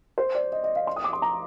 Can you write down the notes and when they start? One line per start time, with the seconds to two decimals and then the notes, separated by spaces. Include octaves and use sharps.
0.18 C5
0.35 D5
0.52 D#5
0.64 D#5
0.76 F5
0.87 C6
0.96 D#6
1.04 D6
1.13 C6
1.22 A#5